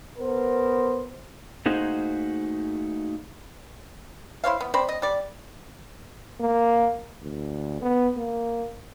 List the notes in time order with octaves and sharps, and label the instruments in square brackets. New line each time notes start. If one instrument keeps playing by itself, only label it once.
[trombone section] B3 A#4 C5
[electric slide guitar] A3 A#3 D#4 F#4 G#4 C5
[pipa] E4 C5 C#5 F5
B3
C4 C5 D5 B5
D#5
G3 D5
[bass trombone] A#3
D2
B3
A#3